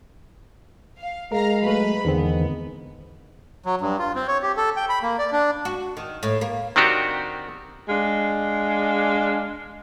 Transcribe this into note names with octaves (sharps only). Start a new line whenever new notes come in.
F5
G#3 A#4 F5 A#5
F#3 A3 B4 B5
E2 G#2 D3 D#3 G#3 B3 C4
F#3
G2
F4
C4
C#5
G4
A4
G5
B5
A#3
D5
D4
F#4
D#3
A2
A#3
D#3 C4 D4 F#4 G4
G#3 D4 F5